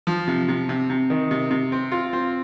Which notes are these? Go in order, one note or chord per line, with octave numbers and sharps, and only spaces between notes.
F3
C3
C3
C3
C3
D#3
C3
C3
C4
F4
C4